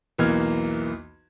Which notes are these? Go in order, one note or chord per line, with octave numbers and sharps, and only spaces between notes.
B1 E2 E3 A#3 F6 G#6